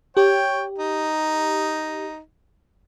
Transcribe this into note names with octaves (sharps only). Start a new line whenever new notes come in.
G4 C#5 G5
D#4